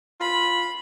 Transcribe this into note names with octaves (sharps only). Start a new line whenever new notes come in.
F4 B5